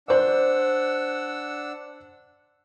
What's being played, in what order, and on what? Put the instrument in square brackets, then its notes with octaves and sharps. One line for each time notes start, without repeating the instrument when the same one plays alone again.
[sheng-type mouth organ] D4 F#5 E6 [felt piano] C5 D5